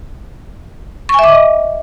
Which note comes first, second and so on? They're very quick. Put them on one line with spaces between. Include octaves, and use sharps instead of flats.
C#6 G#5 E5 D6 D#5